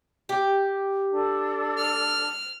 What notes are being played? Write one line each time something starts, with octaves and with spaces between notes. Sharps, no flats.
G4
D4 A4
F6